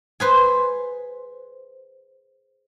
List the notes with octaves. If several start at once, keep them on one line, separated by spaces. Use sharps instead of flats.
G#4 B4 C5